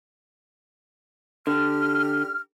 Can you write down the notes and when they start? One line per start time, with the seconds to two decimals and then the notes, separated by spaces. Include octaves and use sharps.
1.47 D3 G4 F6